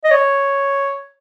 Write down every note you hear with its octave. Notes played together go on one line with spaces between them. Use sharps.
D#5
C#5